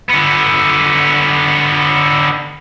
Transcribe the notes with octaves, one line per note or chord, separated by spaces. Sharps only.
D3 B3